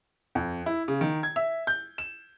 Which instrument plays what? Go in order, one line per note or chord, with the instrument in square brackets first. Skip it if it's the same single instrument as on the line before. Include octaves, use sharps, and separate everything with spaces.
[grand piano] F2
E4
C#3
D#3
G#6
E5
G6
E7